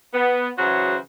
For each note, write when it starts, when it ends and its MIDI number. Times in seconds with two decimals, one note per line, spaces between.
0.14 0.49 59
0.57 0.96 49
0.57 0.96 52
0.57 0.96 54
0.57 0.96 66
0.57 0.96 68
0.57 0.96 72